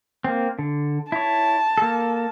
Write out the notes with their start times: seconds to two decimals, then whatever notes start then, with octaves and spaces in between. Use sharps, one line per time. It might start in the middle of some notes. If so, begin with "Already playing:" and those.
0.24 A#3 C4
0.59 D3
1.12 E4 C#5 A5
1.78 A#3 A4